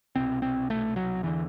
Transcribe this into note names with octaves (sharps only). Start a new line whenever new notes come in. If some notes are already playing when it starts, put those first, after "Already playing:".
C2 B2 C4
C4
A3
F#3
E2 D3 E3